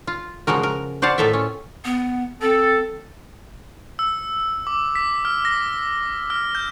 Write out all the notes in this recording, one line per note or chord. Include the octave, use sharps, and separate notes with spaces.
F4
C#3 F3 G#3 F#4 A#4
A#4
F#4 C5 D5 F5 F#5 A5
A2 F4 A4 A#4 E5
C#4
B3
C4 A4
E6
D6
B6
F6
A#6
F6
G6